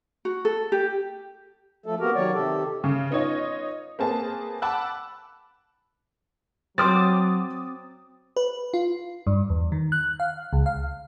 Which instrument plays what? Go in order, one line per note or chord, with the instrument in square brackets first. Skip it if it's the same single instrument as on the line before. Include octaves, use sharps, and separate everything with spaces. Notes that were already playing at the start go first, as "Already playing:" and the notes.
[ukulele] F#4
A4
G4
[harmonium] F3 A3 A4
A#3 B3 F#4 G4 A#4
D#3 F#3 C#5 D5
C3 D#3 G4 A4
[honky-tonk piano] C#3
B3 D#4 F4 C#5 D#5
A#3 C4 G#4 B4 A5
F#5 A5 B5 D6 E6 F#6
[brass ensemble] F#3 [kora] C4 C5 [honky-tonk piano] D6 D#6 A6
[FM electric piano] B4
F4
G2
E2
D#3
F#6
F5
C#2
F5